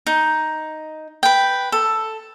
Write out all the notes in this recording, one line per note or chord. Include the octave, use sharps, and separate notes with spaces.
D#4
B4 G5
A4